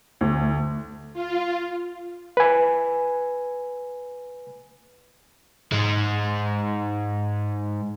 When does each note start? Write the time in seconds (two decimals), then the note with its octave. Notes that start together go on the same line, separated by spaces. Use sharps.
0.21 D2
1.13 F4
2.37 B4 G#5
5.72 G#2 G#3